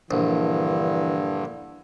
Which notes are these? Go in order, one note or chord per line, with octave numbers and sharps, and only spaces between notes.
A#1 G2 D3 E3